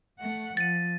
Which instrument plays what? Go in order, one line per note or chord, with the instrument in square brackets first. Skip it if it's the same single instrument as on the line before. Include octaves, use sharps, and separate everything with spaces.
[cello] A3 F#5
[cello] F3 [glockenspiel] A6 D#7